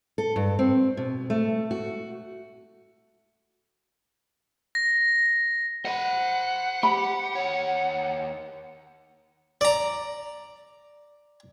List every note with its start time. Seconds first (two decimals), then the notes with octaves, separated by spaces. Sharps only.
0.18 A4
0.36 G2
0.59 C4
0.97 B2
1.30 A3
1.71 F#4
4.75 A#6
5.85 C5 F#5 B5
6.83 G4 B5
7.35 D#2 C#5
9.61 D5 A#5